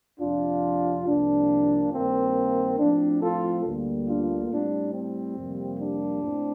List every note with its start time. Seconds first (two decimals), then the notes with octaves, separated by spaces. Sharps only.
0.19 F2 C3 F3 D4 F4
1.06 C2 C3 F3 A#3 D4
1.92 G2 D#3 A#3 C4
2.78 A2 F3 C4 D4
3.22 F4 A4
3.64 D2 D3 G3 A#3
4.08 D4 F4
4.51 A2 G3 C4 D4
4.94 C4
5.38 F2 C3 G3 A#3
5.80 D4
6.24 A2 C4